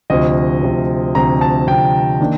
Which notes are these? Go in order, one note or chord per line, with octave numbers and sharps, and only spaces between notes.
D2 C3 F3 D#5
D2 C3 F3
D2 C3 F3 A#5
A5
D2 C3 F3 G5
D#3 A#3 D4